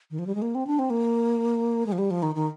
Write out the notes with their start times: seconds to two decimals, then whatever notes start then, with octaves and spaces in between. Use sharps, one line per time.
0.11 D#3
0.19 F3
0.27 G3
0.35 G#3
0.42 A#3
0.55 C4
0.67 D4
0.79 C4
0.90 A#3
1.86 G#3
1.92 F3
1.98 G3
2.11 F3
2.22 D#3
2.35 D#3